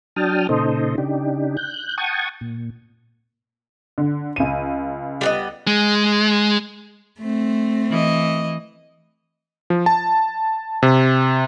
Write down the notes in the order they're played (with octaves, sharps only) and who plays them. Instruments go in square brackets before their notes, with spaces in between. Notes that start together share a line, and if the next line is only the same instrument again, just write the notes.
[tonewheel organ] F#3 D4 G5 A5 D#6 F6
A#2 C#3 D#4 A4 C5 D#5
C#3 D4 D#4 G4
F#6 G6
F#5 G5 A5 C#6 D#6 G#6
A#2
[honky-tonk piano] D3
C#2 D#7
[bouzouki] G3 B3 D#5
[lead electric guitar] G#3
[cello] A3 C4
[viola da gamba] E3 D#5
[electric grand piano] F3
A5
C3